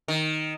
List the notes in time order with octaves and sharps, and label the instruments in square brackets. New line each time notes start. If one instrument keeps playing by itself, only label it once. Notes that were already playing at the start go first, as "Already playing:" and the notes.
[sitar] D#3